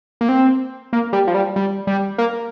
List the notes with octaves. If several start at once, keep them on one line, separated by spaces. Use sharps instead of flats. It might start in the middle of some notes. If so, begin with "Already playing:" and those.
A#3
C4
A#3
G3
F3
G3
G3
G3
A#3